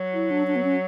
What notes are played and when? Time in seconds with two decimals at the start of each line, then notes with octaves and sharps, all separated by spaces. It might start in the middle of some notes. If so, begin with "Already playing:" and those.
Already playing: F#3
0.14 E4
0.31 D4
0.47 D4
0.56 B3
0.64 C#4